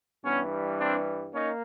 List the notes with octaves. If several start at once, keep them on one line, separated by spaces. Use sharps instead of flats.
G2 E3 G3 B3 C#4
C4 D4
A#3 C#4 D#4